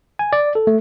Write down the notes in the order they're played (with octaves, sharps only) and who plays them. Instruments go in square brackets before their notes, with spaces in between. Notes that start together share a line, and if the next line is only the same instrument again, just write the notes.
[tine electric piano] G#5
D5
A4
A3